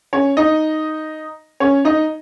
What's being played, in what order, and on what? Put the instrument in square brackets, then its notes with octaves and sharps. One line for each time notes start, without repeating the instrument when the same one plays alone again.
[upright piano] C#4 C#5
D#4 D#5
C#4 C#5
D#4 D#5